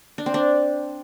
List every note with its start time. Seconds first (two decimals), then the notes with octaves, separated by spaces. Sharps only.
0.18 D4
0.26 C4
0.34 D4